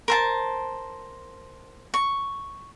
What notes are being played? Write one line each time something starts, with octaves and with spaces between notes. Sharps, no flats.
A#4 C5 A5
C#6